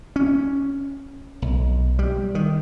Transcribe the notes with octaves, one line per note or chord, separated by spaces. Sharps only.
C#4
B1
G3
D#3